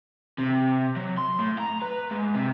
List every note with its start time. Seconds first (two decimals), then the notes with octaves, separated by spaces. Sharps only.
0.38 C3
0.96 F#3
1.17 C6
1.39 A2
1.58 A#5
1.82 B4
2.11 G#2
2.35 C3